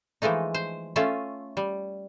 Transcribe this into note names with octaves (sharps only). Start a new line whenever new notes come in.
E3 F3 G#3 A3 D#4
C5
A3 C#4 F4 E5
G3